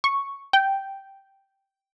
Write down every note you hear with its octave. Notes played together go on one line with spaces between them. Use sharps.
C#6
G5